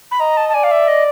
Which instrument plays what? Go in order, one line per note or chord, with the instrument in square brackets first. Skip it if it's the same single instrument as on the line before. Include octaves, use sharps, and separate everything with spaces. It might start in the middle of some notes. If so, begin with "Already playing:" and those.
[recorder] B5
[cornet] D#5 [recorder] A#5
[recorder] A5
A5
[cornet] D5 [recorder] G#5
[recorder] F5
E5
D#5